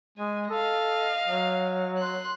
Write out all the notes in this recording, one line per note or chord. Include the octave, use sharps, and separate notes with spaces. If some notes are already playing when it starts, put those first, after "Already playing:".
G#3 G#5
A4 D#5 F5
F#3
C6 F#6